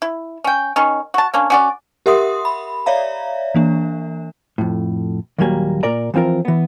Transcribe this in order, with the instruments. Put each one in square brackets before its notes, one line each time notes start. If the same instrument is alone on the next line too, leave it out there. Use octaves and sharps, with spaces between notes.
[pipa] E4
C#4 G5
D#3 C#4
F#4 A5
A#3 C#4 D4
C#4 F#4 D5
[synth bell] G4 A#4 E5 F#5 C6 D#6
B5
C#5 D5 E5 F5 A#5
E3 A#3 D4
[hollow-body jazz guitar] F2 A2
D#2 A#2 F#3 G3 A#3 G#5
A#2 A#4 D5 A#5
E3 F3 C4 F4 A#4
E3 B3